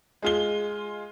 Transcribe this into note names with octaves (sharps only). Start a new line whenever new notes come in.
G#3 F4 G7